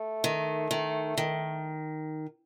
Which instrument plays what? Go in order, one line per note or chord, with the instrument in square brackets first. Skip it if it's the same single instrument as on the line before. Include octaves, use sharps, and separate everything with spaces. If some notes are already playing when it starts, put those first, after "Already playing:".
Already playing: [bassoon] A3
[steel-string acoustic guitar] D#3
D#3
D#3